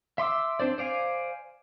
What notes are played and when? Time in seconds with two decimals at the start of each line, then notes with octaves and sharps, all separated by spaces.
0.18 E5 C6 D6 E6
0.60 C4 D4 C5 D5
0.78 C5 D5 F5 G#5